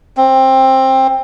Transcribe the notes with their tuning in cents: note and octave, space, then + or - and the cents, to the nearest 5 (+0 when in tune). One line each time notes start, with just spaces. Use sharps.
C4 +15